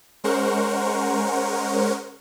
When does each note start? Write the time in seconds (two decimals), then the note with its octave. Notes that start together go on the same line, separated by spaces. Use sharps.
0.24 G#3 C#4 A#4 C5 F#5 C#6